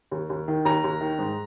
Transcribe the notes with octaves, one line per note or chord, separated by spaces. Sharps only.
D#2
D#2
D#3
D#2 A#5
D#2
D#3
G#2